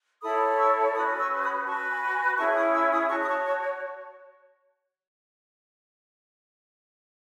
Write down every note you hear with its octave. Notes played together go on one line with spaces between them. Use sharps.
E4 A4 C#5 B5 D#6
C#6 E6
C#4 F#4 B4 B5 D#6
C#6 E6
B5 D#6
F#4 B4 A5 C#6
G#5 B5
C#6
G#5 B5
C#4 E4 G#4 A5 C#6
B5 D#6
C#6 E6
B5 D#6
F#4 C#5 A5 C#6
D#6
A5 C#6
A5 C#6